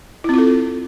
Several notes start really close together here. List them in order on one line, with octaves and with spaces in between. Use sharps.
E4 C4 F4 A4